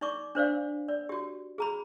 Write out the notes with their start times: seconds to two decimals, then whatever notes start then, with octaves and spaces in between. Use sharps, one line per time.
0.01 D#4 D5 C#6 D6
0.35 D4 C5 D5 F5
0.88 D5
1.09 F#4 G4
1.58 G#4 A#5 B5